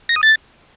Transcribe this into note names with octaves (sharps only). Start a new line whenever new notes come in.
A#6
D#6
A6